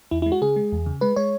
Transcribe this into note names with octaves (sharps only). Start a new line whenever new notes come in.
E2 E4
E4
G#3
F#4
C#3 G#4
G#3
E2
C#3
G#3 B4
G#3 C#5